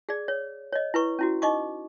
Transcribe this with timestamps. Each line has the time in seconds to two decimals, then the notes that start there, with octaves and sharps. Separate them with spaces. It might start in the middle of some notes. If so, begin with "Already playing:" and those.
0.09 G#4 D5
0.28 C#5
0.73 C#5 D#5
0.94 E4 B4 C#6
1.19 C#4 E4 F#4
1.42 D#4 D#5 C#6 D6